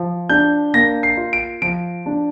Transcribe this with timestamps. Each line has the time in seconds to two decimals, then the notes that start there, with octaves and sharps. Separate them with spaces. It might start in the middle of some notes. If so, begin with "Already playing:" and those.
Already playing: F3
0.29 D4 G6
0.74 A#3 A#6
1.03 C7
1.17 F4
1.33 D7
1.62 F3 D7
2.06 D4